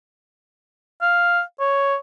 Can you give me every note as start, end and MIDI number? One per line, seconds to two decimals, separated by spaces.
1.02 1.41 77
1.60 1.96 73